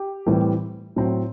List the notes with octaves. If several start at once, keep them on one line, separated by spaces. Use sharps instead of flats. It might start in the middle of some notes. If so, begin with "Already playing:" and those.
Already playing: G4
A2 E3 G3 C4
A2 F#3 C4